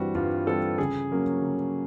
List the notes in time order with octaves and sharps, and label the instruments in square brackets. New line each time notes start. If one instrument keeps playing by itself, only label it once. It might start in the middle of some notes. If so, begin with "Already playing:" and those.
Already playing: [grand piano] G2 E3 G3 C4 F#4
G2 F4
E3 G3 C4 A4
C#3 G#4
F#3 A#3 C#4
C#3